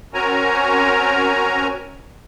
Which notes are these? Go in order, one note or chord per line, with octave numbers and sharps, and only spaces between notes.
C4 C#4 F#4 A#4 G#5 A#5